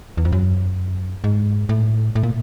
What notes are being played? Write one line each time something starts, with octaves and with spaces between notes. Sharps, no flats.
E2
F2
F#2
G#2
A2
A2
A#2